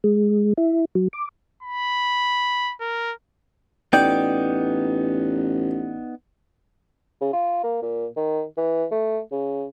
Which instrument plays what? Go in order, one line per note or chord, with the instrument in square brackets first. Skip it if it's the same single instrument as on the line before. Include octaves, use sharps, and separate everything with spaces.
[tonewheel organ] G#3
E4
F#3
D6
[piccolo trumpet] B5
A#4
[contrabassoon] A1 [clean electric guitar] B3 D#4 D5 [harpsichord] G5
[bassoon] C#3
F4
A#3
A#2
D#3
E3
A3
C#3